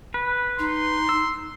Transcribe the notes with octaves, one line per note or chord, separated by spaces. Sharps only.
B4
D#4 C6
E6